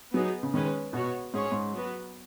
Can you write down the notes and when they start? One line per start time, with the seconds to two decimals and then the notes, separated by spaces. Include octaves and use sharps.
0.14 F#3 B3 D#4 G#4 B4
0.43 C#3
0.53 D#3 G#3 C#4 B4
0.93 B2 B3 F#4 C#5
1.33 G#2 C#4 G#4 C#5
1.51 G#2
1.73 F#3 B3 F#4 B4